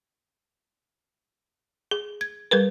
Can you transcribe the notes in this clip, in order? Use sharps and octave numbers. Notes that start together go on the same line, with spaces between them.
G#4
G#6
G3 G#4 A#4 B4